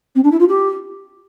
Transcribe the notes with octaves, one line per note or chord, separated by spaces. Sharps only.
C4
D4
E4
F4
G4